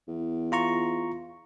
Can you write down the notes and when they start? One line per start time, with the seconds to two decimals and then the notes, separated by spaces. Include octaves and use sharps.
0.08 E2
0.52 F4 A#5 C#6